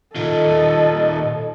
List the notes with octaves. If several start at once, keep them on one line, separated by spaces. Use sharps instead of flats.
A#2 D#3 F4 A4 D#5